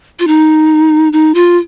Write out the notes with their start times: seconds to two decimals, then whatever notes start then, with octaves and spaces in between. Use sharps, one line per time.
0.20 F4
0.27 D#4
1.13 D#4
1.35 F4